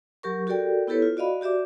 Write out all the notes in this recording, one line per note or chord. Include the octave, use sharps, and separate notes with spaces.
F#3 G4 A#4 C#6
F#4 G4 A4 A#4 D5 G5
B3 E4 G4 A4 B4 C#5
F4
F#4 D5 D#5 F5 B5
F#4 G4 D5 E5 D6